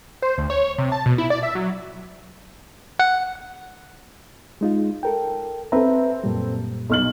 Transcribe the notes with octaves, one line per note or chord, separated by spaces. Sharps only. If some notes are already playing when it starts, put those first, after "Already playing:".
C5
D2
C#5
C3
A5
B2
E4
D5
E5
F#3
F#5
G#3 D#4 F4
A4 A#4 G5
C4 A4 B4 E5 A#5
F#2 A#2 G3
B1 F6 F#7